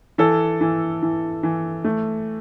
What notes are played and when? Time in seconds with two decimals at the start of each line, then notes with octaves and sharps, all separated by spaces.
0.18 E3 A4
0.61 E3
1.02 E3
1.43 E3
1.84 A3